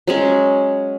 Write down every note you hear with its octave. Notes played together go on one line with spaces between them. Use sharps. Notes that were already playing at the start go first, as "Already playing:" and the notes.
F#3 G#3 C#4